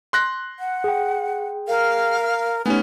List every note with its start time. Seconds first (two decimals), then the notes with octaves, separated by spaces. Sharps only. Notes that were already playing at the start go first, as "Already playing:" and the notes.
0.13 C6 F#6 A#6
0.59 F#5
0.84 G#4 G5
1.68 A#4 F5
2.66 A3 B3 C#4 D#4 G4 G#5